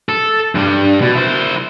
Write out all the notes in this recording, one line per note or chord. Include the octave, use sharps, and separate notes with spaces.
A4
G2 G3
B2
E4 C5